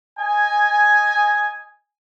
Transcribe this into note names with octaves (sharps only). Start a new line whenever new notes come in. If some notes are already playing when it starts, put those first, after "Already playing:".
D#5 G#5